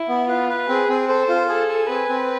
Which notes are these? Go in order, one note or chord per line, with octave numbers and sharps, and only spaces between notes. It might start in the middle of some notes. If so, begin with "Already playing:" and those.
Already playing: E4
B3
F4 B4
B4
C4 G#4
C4
A4 C5
F4
G#4 A4
G#5
C4 B4
C4